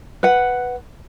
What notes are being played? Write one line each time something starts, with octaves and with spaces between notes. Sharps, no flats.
B4 F#5